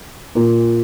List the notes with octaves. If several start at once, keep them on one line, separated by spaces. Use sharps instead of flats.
A#2